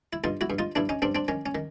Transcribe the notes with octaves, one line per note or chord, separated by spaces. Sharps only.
E4
G2 D#4 F4
E4 F#4
G2
D#4 F4
G2 D4 E4
C#4 D#4
G2 C4 D4
C4 D4
D#3 C#4
C#4
D#3